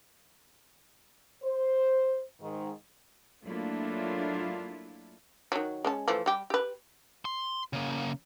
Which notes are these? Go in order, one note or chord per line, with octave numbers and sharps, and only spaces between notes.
C5
G#2 D#3
F#3 A3 A#3 D4 E4 F4
D#3 F#3
G#3 C#4 A5
E3 F3 A3
G3 G4
G4 B4
C6
C#3 A#3